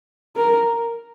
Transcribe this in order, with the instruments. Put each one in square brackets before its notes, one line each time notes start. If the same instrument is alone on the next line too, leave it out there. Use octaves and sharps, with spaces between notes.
[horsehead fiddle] A#4